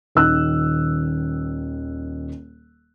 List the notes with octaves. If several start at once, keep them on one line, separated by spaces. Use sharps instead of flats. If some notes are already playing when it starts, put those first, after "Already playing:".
D#1 D#3 E6 F#6